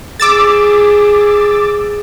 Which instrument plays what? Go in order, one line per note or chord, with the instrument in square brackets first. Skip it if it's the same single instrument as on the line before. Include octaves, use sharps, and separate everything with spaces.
[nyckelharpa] G#4 [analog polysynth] D6 E6 A6